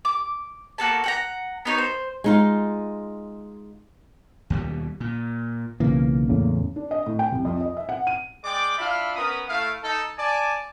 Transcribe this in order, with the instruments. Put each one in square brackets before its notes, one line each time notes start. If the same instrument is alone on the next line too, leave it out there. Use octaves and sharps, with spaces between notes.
[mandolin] D6
A#3 F#4 A4 A5
F#5 G5 A#5
B3 D#4 C#5
C5
[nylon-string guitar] G#3 D#4 F4
[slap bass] D#2 B2 G3
A#2
[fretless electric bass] B1 C#3 E3 [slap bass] A#3
[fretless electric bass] E2 A2 C#3
[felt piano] D4
D#5
A2
G5
C2
F2
D#5
E5
F#5
D#7
[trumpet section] G#3 D5 G5 D6
D4 E4 F4 E5 F5 B5
B3 C#4 A#4 B5 D#6
A3 E4 F5
D#4 A4
D5 G#5 A5